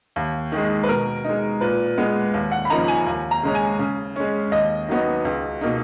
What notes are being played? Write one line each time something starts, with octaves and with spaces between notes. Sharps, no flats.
D#2
D#3 G#3
B4
B2 A#4
G#3 D#4
A#2 B4
G#3 B3
D#2
F#5
B5
C#3 F3 A#3 D#4 A#5
G#5
D#2
A#5
C#3 G#3 C#4
G#5
C#3
G#3 C#4
D#2 D#5
D#3 F#3 B3 D#4
C#2
B2 A#3 D#4